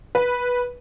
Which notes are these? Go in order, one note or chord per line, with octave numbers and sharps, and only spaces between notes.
B4